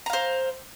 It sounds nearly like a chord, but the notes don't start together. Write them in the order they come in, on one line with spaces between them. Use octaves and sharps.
A#5 F5 C5